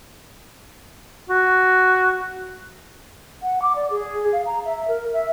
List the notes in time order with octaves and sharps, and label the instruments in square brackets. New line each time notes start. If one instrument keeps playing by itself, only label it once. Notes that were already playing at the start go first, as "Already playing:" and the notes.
[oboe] F#4
[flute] F#5
D6
D5
G#4
F5
A#5
E5
A#4
E5